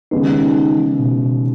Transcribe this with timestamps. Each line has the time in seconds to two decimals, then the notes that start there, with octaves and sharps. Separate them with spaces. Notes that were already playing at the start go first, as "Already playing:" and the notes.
0.11 D#2 C#3 G#3 B3 D#4
0.28 D#4
0.78 E3
0.99 B2
1.10 B2